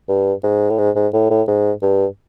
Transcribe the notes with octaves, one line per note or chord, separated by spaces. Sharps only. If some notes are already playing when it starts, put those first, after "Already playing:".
G2
G#2
A2
G#2
G#2
A2
A2
G#2
G2